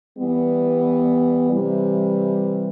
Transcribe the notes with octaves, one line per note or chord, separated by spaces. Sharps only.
E3 G3 B3
C3 E3 G3